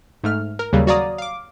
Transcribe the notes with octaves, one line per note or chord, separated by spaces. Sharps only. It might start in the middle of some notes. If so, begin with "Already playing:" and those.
G#2 A3 F6
A#4
D#2 C#3 F#3 G3
F#4 C#5 D5 F5 A#5 D#6
F5 D6